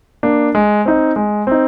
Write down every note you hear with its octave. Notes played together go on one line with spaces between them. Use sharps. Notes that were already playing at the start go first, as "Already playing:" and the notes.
A#3 D4
G#3
C4 D#4
G#3
C4 D#4